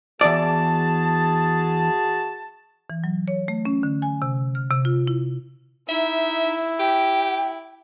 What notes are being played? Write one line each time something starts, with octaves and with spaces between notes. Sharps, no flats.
E2 F#4 G#4 D5 A5
E3
F#3
C#5
A3
C#4
D3
G#5
C3
F6
C3
F4
E4
D#4 E4 E5
G4 G5